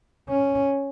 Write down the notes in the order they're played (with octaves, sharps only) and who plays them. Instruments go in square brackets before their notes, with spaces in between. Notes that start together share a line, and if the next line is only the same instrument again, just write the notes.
[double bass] C#4